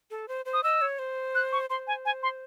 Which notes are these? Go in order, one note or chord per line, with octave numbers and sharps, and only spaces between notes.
A4
C5
C5
D#6
D#5 E6
C#5
C5
F#6
C#6
C5 C6
G#5
G#5
C6